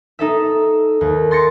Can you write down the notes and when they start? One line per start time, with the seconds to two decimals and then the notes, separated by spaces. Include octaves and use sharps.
0.19 D#4 A4 E5
1.01 D#2
1.31 C6 A6 A#6 C#7